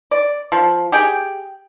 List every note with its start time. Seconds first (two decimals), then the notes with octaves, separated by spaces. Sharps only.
0.11 D5
0.52 F3
0.92 G4 G#4 G5